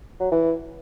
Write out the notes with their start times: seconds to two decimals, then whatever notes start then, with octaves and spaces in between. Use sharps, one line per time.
0.20 F#3
0.32 E3